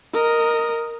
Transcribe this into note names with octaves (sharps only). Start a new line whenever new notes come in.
A#4 D#5